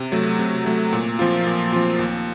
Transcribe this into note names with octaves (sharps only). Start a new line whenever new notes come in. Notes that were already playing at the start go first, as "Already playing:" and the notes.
Already playing: C3
F#3 A3
C3
F#3 A3
A#2
F3 C4 F4
A#2
F3 C4 F4
D#2